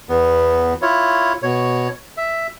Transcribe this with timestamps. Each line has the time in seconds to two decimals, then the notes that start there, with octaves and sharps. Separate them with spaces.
0.09 E2 B3
0.82 E4 F4 C#5
1.43 B2 C#5
2.17 E5